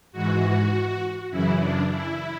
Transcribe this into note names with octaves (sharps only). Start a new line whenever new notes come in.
G#2 E3 F#4
F#2 C#3 E3 E4
D4
E4